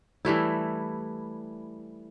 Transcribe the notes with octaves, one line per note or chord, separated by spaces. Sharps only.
E3 G3 A3 E4